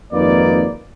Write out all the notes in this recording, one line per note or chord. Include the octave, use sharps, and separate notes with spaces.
G#1 F2 A#3 D#4 B4 D5